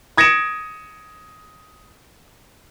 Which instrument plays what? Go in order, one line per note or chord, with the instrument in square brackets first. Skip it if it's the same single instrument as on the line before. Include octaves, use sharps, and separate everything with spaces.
[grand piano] D#6 G#6 A#6 C#7 D7 E7